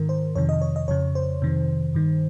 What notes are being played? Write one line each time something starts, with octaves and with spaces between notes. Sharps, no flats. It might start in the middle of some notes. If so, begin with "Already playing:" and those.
Already playing: G#2 D#3 A#4
C5
F2 C3 D#3 C#5
D#5
C#5
D#5
F2 C#3 C#5
C5
F2 C3 D#3
G2 D#3